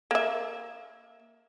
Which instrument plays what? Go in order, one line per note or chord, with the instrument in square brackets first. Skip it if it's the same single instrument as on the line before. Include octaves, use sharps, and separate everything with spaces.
[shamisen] A#3 E5